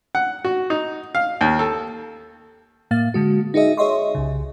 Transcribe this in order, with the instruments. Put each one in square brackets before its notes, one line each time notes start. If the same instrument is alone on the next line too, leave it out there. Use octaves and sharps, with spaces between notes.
[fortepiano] F#5
F#4
D#4
F5
D#2
A4
[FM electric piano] A2 A#3 F5 A6
D3 G#3 F#4
D#4 F#4 G#4 D#5 E5
G#4 C#5 D#5 E5 C6 C#6
C2 C#3